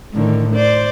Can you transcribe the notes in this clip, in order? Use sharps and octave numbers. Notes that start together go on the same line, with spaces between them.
A2 D3 D#3
C5 D5